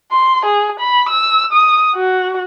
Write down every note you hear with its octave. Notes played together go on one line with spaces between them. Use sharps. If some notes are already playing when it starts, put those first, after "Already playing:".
C6
G#4
B5
E6
D#6
F#4